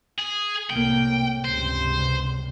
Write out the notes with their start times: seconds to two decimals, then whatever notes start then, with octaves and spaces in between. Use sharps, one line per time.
0.19 G#4
0.70 C2 A2 A#3 G5
1.45 C#2 G2 C3 C5